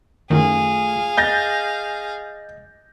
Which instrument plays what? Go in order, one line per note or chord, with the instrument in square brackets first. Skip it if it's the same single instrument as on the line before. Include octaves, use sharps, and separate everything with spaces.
[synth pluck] F#2 D#3 [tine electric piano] A3 F4 [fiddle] G#4 F5
[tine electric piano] D#5 [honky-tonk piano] G6 A6 A#6